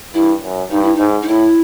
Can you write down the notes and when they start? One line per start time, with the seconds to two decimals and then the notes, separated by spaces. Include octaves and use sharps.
0.14 G2 E4
0.43 F#2
0.71 G2 D#4
0.83 E4
0.95 G#2 D#4
1.23 D#4
1.28 A2 E4